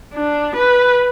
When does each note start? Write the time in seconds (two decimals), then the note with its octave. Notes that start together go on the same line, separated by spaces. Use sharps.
0.14 D4
0.56 B4